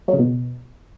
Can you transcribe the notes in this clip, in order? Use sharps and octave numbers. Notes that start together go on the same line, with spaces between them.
F#3
C#3
B2